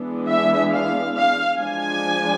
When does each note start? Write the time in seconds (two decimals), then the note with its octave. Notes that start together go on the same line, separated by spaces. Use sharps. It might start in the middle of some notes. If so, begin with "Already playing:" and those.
Already playing: E3 G#3 B3 D4
0.29 E5
0.73 F5
1.16 F5
1.59 F3 G#3 D4 G#5